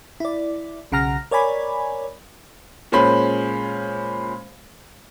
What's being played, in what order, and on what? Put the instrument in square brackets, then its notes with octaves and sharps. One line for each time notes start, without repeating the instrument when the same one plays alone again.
[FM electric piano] E4 D5
B1 C#3 F#5 A#5 F6 A#6
A#4 C#5 D5 G#5 B5
[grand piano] A#2 G#3 C#4 C5 B5